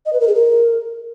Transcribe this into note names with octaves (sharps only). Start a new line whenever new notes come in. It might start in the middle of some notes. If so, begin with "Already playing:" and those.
D#5
B4
A#4
G#4
A#4